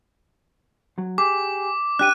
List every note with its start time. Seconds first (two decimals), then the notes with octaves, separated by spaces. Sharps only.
0.98 F#3
1.18 G4 G#4 D6
1.99 D4 G4 F#6 D#7